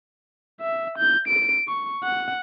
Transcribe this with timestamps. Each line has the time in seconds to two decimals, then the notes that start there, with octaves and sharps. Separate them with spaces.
0.60 E5
0.98 G6
1.28 D7
1.68 C#6
2.04 F#5